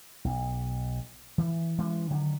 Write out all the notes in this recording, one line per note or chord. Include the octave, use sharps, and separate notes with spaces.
B1
E3
E3 G#3 C#4
D3 D#3 F#3